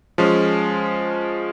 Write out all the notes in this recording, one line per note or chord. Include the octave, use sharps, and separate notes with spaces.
F3 G#3 C#4